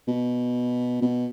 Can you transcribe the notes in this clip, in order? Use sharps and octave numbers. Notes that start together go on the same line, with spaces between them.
B2
B2